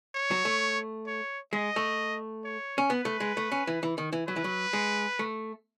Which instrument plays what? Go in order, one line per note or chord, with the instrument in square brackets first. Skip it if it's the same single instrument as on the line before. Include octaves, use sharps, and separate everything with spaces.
[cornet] C#5
[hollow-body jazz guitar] F#3
A3
[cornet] C#5
[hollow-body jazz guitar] G#3 [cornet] D#5
[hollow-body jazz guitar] A3
[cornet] C#5
[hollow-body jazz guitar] C#4
[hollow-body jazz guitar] B3 [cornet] B4
[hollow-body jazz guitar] A3
G#3
A3
C#4
E3
E3
D#3
E3
[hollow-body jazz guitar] F#3 [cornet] B4
[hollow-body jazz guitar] E3
F#3
G#3
A3